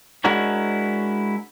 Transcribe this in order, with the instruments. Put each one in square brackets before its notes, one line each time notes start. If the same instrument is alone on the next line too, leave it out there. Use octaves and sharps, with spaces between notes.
[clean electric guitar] G#3 D4 E4 F#4 A#4 C#5